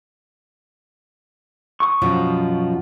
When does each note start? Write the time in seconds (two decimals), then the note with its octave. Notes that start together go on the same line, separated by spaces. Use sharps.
1.80 C#6 D#6
2.02 F#2 B2 F3